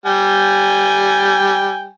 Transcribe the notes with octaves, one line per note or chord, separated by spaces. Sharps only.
G3 G5 G#5